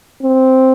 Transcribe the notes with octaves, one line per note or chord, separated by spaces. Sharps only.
C4